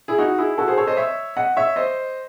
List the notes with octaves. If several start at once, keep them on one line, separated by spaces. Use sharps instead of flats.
E4 G#4
D#4 F#4
E4 G#4
F#4 A4
G#4 C5
A4 C#5
C5 D#5
C#5 E5
D#5 F#5
C#5 E5
C5 D#5